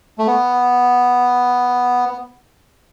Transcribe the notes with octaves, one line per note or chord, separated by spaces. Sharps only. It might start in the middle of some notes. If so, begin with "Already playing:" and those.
A3
B3
B3